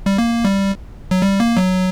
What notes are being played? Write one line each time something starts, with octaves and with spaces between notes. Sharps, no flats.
G3
A#3
G3
F#3
G3
A#3
F#3